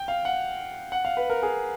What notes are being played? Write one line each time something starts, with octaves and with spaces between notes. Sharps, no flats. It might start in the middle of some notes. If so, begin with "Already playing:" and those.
Already playing: G5
F5
F#5
F#5
F5
B4
A#4
G#4